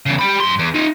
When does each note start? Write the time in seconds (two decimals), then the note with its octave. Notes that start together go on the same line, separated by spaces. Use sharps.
0.06 E2 C#3
0.19 G4 B5
0.40 F#2 C6
0.59 E2
0.75 D#4 F4